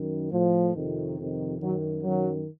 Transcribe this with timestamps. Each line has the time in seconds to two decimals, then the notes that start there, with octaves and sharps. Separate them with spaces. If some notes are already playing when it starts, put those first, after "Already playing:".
Already playing: F#2 D#3
0.32 A2 F3
0.75 F2 C3 D#3
1.18 F2 C3 D#3
1.61 F#2 D#3 F#3
2.03 F#2 D#3 F#3